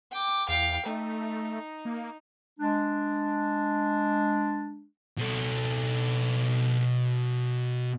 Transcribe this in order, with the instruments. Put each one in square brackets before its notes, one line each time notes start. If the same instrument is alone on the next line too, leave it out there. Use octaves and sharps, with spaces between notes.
[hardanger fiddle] G5 D6
[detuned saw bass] E2 [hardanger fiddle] F5 G5
[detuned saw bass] A3 [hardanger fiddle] D#4
[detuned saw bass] A#3
[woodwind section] G#3 D4
[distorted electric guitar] B2 A4